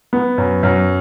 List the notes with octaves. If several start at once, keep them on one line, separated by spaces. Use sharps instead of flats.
B3
F#2
F#2